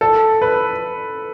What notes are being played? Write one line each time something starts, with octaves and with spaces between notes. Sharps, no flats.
A4
B4